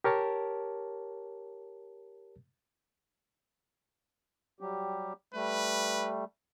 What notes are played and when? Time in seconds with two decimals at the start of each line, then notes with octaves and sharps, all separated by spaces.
0.04 G4 A#4 C#5 A5
4.61 F#3 G3 G4
5.34 G3 A3 B4